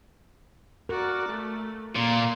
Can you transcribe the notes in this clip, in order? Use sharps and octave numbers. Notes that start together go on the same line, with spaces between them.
F#4 A#4 D5
A3
A#2 A#3 C6